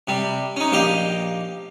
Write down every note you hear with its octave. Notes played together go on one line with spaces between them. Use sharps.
C3 G3
C#4 D#4
A#1 G4 D#5 F5